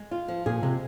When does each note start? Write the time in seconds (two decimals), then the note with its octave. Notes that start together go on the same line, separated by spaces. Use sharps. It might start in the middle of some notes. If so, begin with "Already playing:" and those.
Already playing: G#3
0.11 F4
0.28 F3
0.46 A#2 G#4
0.63 C3 G#3